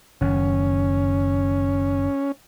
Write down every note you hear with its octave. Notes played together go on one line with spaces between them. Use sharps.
F#1 F#2 D#3 C#4